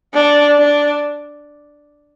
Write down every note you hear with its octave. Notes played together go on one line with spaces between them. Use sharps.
D4
D4